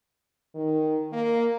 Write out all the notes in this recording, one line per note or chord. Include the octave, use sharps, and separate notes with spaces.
D#3
A#3